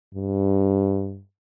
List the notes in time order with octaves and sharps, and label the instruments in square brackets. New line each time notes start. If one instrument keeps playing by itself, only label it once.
[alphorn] G2